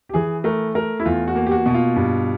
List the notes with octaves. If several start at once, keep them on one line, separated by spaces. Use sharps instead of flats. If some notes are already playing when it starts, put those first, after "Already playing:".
G4
E3 G#4
A3 A#4
A3 A#4
E4
E2 F4
F#4
A#3
G4
F#4
B2
F4
G2